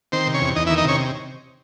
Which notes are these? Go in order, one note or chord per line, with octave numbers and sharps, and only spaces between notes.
D#3 C4 C5
C3
C#4 C#5
E2
E2 D#4 D#5
E4 E5
D#3
D#4 D#5
C3 C#4 C#5